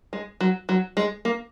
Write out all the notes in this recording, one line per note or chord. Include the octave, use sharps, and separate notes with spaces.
G#3
F#3
F#3
G#3
A#3